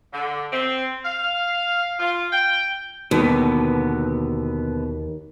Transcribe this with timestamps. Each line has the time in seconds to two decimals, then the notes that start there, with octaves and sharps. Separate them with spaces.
0.13 D3
0.52 C4
1.05 F5
2.00 F4
2.32 G5
3.11 D#2 B2 D3 B3